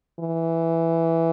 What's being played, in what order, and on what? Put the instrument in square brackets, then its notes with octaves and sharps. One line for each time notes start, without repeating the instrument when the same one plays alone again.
[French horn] E3